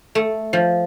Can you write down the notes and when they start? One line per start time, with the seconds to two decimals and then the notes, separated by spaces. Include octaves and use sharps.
0.15 A3
0.53 F3